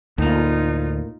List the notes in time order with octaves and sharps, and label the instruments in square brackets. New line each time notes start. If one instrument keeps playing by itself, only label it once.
[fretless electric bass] D2 [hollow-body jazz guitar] A2 A#3 [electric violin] D#4 F4